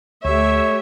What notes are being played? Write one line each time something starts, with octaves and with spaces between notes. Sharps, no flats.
D2 A3 G4 C#5 E5